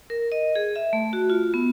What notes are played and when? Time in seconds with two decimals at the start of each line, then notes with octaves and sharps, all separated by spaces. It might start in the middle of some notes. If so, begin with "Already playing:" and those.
0.10 A#4
0.32 D#5
0.55 G#4
0.76 E5
0.93 A3
1.13 F#4
1.30 F4
1.54 B3